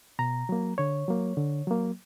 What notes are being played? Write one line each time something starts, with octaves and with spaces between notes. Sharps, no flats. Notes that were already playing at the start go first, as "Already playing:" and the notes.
B2 A#5
F#3 A#3
D3 C#5
F#3 A#3
D3
F#3 A#3